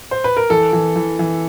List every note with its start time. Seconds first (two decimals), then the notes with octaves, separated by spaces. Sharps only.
0.11 C5
0.24 B4
0.37 A#4
0.50 E3 A4
0.73 E3
0.96 E3
1.19 E3